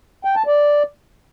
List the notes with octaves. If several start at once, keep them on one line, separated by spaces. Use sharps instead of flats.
G5
A5
D5